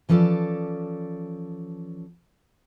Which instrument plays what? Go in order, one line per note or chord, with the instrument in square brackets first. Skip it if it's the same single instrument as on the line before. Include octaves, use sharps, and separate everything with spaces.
[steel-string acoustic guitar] E3 F3 C#4 A4 D5